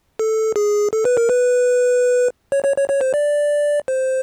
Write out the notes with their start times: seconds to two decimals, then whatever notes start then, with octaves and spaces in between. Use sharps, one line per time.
0.19 A4
0.56 G#4
0.93 A4
1.05 B4
1.17 A#4
1.29 B4
2.52 C#5
2.64 C#5
2.77 C#5
2.89 C#5
3.01 C5
3.14 D5
3.88 C5